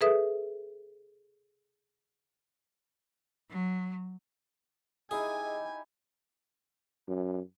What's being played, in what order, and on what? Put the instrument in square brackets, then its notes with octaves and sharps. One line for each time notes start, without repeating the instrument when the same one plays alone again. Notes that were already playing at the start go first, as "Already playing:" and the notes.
[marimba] G#4 A4 B4 E5 D#6
[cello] F#3
[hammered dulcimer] D#4 E4 G4 [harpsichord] G#4 [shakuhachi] D#5 [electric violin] G#5
[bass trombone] F#2